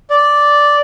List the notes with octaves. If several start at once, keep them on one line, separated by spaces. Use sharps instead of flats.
D5